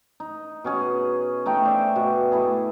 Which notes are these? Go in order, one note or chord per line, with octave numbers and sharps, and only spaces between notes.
D#4
B2 C#4 G#4
A3 D#4 G5
C5 D5 E5
B2
A3 E4 G#4